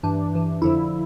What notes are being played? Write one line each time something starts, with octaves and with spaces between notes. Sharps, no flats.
G2 E3 D4
G2 E3
F2 D3 F3 E4